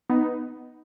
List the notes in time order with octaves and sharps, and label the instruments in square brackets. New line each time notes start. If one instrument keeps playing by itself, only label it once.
[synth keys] B3 D#4